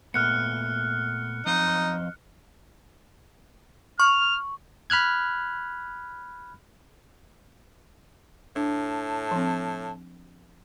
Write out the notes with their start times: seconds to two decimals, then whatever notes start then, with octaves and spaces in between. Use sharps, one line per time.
0.14 A#2 A3 B3 F6 F#6 C#7
1.46 F3 C4 D#4 D#5
4.00 C#6 F6
4.90 B5 F6 F#6 G#6
8.56 A2 D4 A5
9.31 F3 C4